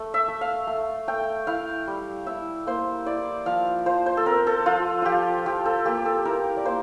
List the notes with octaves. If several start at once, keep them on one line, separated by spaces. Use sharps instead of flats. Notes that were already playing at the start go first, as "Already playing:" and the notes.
Already playing: A3
E5
A3
F5
A3
A3 G5
E4 F5
G3
E4 E5
A#3 C5
E4 D5
F3 F5
F3 C5
C5
A4
C4 A#4
A4
F3 F4
F3 F4 G4
F3 G4
A4
A#3 G4
A4
E4 A#4
D5
A#3 C5